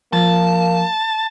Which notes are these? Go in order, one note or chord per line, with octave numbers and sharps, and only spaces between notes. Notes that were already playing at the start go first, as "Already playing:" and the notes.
F3 A#3 A5